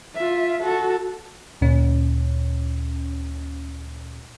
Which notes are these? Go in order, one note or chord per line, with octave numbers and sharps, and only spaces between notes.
F4 E5
F#4 A4
D2 A#2 C#4